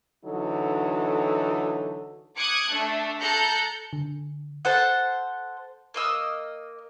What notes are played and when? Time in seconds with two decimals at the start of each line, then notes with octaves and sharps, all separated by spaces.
0.25 D3 E3 F#3 D#4 A4
2.37 D6 D#6 F#6 G#6 C#7
2.69 A3 D4
3.19 A4 A#5 F#6 G6 C#7
3.93 D3
4.65 A4 C5 F#5
5.94 A#3 D#5 E6 F6